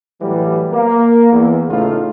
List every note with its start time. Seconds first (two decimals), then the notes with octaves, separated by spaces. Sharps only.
0.21 A2 E3 F#3 G3
0.71 A#3
1.32 E2
1.68 A2 C#3 A3 D#4 F4